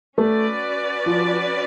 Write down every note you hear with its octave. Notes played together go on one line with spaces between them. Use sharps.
A3 C#4 F#4 B4 D5
F3